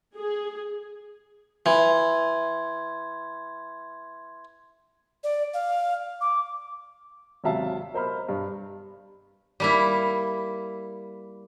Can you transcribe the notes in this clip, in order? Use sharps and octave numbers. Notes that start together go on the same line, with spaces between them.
G#4
E3 C6 G#6
D5
F5
D6
G#1 C3 F#3 E5 F5 A5
A#4 C5 D#5 B5 F6
G2
G3 A#3 E4